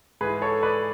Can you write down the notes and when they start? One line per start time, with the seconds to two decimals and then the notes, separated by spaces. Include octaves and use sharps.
0.21 G#2 E3 G#4 B4
0.42 A4 C#5
0.63 B4 D5